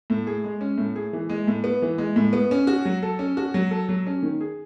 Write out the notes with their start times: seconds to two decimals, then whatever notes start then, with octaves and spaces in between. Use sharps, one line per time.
0.10 A2
0.27 G#4
0.44 G#3
0.61 C#4
0.78 A2
0.96 G#4
1.13 E3
1.29 G#3
1.47 A2
1.64 B3
1.82 E3
1.98 G#3
2.16 A2
2.33 B3
2.51 C#4
2.67 F#4
2.85 F#3
3.03 A4
3.19 C#4
3.37 F#4
3.54 F#3
3.71 A4
3.89 F#3
4.06 C#4
4.23 D#3
4.41 G#4